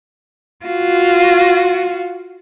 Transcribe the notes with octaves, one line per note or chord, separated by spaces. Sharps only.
F4 F#4